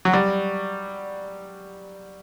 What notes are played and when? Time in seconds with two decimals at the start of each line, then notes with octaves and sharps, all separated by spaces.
0.05 F#3
0.14 G3